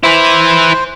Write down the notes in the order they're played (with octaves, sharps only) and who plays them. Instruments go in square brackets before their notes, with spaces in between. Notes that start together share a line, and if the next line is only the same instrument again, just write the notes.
[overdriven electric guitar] E4 B4 [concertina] C5